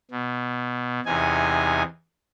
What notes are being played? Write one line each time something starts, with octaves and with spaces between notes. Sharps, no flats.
B2
E2 C3 D#4 G#5